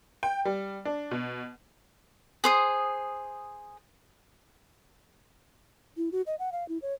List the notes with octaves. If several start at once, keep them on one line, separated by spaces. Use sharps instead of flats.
G5
G3
D4
B2
G#4 C5 D#6
E4
F#4
D#5
F#5
F5
E4
C#5